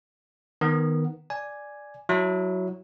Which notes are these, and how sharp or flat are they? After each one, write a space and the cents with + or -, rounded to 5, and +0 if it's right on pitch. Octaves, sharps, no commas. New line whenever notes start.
D#3 +0 B3 +0
D5 +0 G#5 +0
F#3 +0 E4 -5